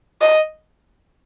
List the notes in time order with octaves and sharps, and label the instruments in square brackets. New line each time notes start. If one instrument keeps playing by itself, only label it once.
[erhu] D#5